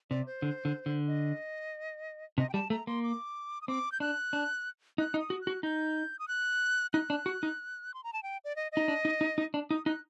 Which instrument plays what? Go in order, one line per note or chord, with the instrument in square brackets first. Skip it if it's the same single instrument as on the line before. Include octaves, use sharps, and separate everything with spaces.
[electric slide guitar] C3 [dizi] D5
[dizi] C5
[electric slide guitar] D3
D3
D3
[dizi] D#5
[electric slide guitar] C3 [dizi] D#5
[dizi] G5
[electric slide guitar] G3 [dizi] A5
[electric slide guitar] A3 [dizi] A#5
[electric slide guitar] A#3 [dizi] C6
[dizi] D6
D#6
[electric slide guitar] C4 [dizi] D6
[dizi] G6
[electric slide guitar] D4 [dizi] F#6
[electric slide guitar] D4
[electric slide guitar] D#4 [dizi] F#6
[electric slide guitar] D#4
[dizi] D#6
[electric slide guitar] F#4
[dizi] F#6
[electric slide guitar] F#4
[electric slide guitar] D#4 [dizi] G6
[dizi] D#6
F#6
[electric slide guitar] D#4 [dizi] F#6
[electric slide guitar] D4
F#4
D#4
[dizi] C6
A#5
A5
G5
D5
D#5
[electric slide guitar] D#4 [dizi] D#5
[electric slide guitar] D4
D#4
D#4
D#4
D4
[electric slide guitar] D#4 [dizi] D#6
[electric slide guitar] D#4 [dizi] F#6